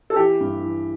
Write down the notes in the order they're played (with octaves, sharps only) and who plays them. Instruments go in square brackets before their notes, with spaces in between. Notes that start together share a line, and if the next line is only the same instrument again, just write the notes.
[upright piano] A4
E3 G4
G2
E3